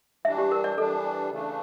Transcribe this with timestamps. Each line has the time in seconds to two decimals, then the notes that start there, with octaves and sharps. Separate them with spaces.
0.25 E3 G3 D4 E5
0.38 G4
0.52 A#4
0.64 D5
0.78 E3 G3 D4 A4
1.30 C#3 E3 A3 D4